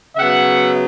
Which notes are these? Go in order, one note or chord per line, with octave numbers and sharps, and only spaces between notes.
C#3 F#3 B3 E5 F#5